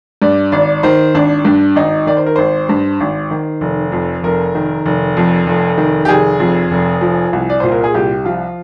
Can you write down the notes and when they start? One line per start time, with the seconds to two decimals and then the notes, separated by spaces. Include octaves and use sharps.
0.22 G2 D5
0.52 G#1 D5
0.83 D#3 C5
1.14 G#1 D4
1.45 G2 D4
1.76 G#1 D#4
2.07 D#3 D5
2.17 C5
2.26 A#4
2.36 G#1 C5
2.69 G2
3.00 G#1
3.31 D#3
3.61 F1
3.92 F2
4.24 F1 A#4
4.55 D#3
4.86 F1
5.17 F2
5.47 F1
5.77 D#3
6.05 G4
6.08 F1 G#4
6.40 F2
6.71 F1
7.01 F3
7.33 C2
7.50 D5
7.60 A#2 C5
7.71 A#4
7.84 G#4
7.94 C2 G4
8.25 F3 F4